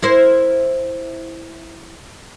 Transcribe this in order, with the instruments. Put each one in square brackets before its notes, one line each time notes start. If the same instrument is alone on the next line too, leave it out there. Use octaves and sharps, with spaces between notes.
[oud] E4 A#4 C5